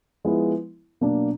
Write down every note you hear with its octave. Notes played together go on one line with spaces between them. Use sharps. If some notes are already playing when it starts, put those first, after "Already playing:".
F3 G#3 B3 E4
B2 F#3 A#3 D4